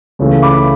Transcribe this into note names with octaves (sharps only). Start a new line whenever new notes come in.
C#2 C#3 E3 A3
B5 D6